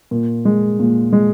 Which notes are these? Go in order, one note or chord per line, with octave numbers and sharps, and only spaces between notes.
A#2
G#3
A#2
G#3